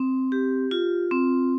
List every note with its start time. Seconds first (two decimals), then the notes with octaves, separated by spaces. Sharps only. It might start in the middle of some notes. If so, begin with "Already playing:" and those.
Already playing: C4
0.32 G4
0.71 F4
1.11 C4